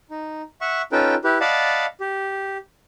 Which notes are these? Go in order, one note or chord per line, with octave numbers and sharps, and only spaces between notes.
D#4
E5 F#5 C#6
C#4 D#4 F4 A4 B4 G5
E4 G4 B4
D5 D#5 F5 F#5 A5 B5
G4